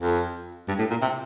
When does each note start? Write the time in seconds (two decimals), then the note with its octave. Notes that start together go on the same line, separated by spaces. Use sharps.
0.01 F2
0.68 G2
0.79 A2
0.90 A#2
1.02 C3